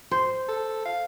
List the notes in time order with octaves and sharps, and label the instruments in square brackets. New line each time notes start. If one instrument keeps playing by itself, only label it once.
[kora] C5
[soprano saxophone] A4
F5